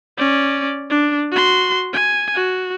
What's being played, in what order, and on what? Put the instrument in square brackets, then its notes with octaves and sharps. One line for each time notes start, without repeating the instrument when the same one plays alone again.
[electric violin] C#4 D5
D4
F#4 C6
G#5
F#4